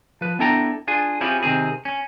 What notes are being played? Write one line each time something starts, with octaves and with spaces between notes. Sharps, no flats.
F3 B4
B3 D4 E4 A4 G5 A#5
D4 F4 G#4
C4 C#4 E4 F4 G4 G#4
C3 D#3 C4 G#4
C#4